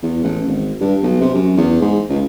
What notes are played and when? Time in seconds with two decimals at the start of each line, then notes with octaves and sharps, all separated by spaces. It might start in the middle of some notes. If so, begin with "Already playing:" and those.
0.02 E2
0.24 A1
0.47 G#1
0.81 G2
1.03 B1
1.21 C3
1.34 F#2
1.57 E2
1.81 G#2
2.09 C#2